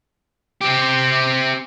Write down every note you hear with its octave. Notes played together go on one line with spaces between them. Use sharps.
C4 G4